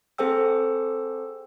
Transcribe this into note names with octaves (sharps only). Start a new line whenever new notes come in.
C4 G#4 A4 C5 G5 E6